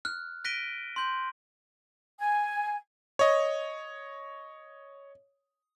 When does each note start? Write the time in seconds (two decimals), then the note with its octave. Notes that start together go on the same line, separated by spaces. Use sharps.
0.05 F6 F#6
0.45 F#6 A#6 B6 D7 D#7 G7
0.96 C6 G6
2.18 G#5
3.19 C#5 D#5